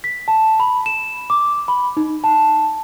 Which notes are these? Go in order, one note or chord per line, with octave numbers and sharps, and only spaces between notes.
B6
A5
B5
E7
D6
B5
D#4
A5